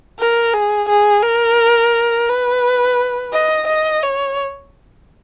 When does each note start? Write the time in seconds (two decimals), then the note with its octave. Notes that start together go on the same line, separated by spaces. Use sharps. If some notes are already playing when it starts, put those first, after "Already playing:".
0.19 A#4
0.53 G#4
0.88 G#4
1.23 A#4
2.29 B4
3.33 D#5
3.67 D#5
4.03 C#5